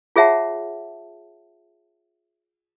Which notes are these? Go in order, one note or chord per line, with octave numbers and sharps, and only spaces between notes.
F4 G#4 C#5 E5 F#5 A5